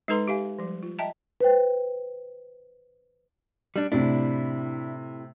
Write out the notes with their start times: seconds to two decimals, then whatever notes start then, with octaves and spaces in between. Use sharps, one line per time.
0.08 G#3 D#4 A4 B4 A#5 C6
0.28 G4 E5 F5 G#5
0.59 F3 G3
0.83 F4
0.98 D#5 E5 G5 A5 A#5
1.41 B4 C5 G5
3.76 G3 D4
3.92 A2 C3 D4 E4